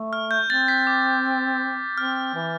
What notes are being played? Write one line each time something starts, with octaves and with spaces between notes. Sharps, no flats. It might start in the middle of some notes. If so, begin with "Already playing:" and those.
Already playing: A3
F6
G6
C4 A6
B6
D6
C4 F6
E3